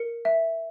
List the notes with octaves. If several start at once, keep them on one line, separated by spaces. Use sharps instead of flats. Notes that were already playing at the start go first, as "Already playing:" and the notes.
Already playing: A#4 C#7
E5